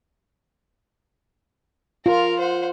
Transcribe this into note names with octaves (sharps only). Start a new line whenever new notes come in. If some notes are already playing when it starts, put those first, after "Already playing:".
F4 A#4 F5
C5 F#5